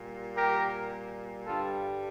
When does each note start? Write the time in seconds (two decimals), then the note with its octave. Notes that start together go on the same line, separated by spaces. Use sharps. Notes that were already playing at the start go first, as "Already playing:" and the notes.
Already playing: A#2 G3
0.37 G4 A#4
1.46 G2 D3 G3 F4 A4